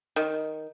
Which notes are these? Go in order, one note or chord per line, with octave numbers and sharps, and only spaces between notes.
D#3